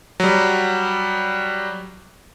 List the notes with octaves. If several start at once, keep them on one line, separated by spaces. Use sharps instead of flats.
F#3 G3